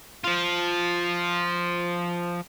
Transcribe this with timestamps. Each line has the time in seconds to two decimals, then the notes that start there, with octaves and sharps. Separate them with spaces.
0.24 F3 F4